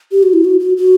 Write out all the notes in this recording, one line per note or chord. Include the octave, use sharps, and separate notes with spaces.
G4
F#4
E4
F#4
F#4
F#4